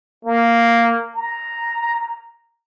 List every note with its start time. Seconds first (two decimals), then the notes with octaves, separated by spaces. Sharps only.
0.25 A#3
1.15 A#5